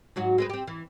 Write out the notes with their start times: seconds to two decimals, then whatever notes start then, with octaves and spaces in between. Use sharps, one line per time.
0.16 G#2 F#3 F#4
0.38 G#3 C4 B4
0.50 C4 G4
0.67 E3